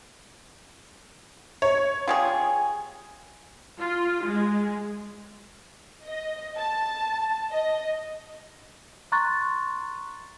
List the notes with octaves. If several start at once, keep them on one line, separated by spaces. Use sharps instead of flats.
C#5
F4 G4 G#4
F4
G#3
D#5
A5
D#5
A#5 C6 C#6 F#6 A6